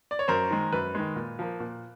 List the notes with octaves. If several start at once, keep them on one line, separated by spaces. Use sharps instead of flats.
D5
C#5
F#2 A#4 C5
D#3 G#3
F#2 B4
D#3 G#3
A#2
F3 A#3
A#2